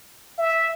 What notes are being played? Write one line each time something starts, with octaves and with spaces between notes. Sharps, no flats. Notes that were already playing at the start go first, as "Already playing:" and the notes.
E5